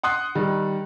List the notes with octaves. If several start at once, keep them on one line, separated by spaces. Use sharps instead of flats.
F#5 C6 D#6 F#6
D#3 G3